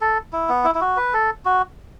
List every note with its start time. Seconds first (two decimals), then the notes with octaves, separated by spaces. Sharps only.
0.01 A4
0.33 E4
0.49 B3
0.64 E4
0.75 E4
0.81 F#4
0.97 B4
1.14 A4
1.45 F#4